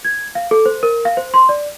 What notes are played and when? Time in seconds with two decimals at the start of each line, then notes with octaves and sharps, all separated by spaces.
0.05 G#6
0.35 F5
0.51 A4
0.66 C5
0.83 A#4
1.05 F5
1.17 C5
1.34 C6
1.49 D5